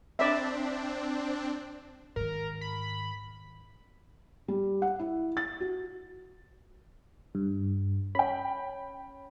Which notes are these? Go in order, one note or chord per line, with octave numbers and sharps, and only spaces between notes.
C4 D4 D5 E5
G#2 D#3 A#4
B5
G3
F#5
E4
A6
F#4
G2
C#4 G5 B5